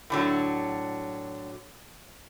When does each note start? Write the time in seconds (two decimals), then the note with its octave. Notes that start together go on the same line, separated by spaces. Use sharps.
0.10 A2 D3 F#3